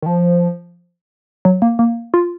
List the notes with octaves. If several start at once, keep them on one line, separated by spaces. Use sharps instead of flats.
D#3
F3
F#3
A#3
A#3
F4